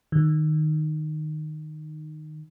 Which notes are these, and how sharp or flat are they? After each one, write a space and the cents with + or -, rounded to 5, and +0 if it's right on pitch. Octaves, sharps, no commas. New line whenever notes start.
D#3 -15